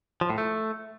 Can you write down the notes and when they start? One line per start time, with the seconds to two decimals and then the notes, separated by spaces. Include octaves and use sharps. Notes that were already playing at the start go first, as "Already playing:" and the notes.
0.21 F3
0.30 A2
0.38 A3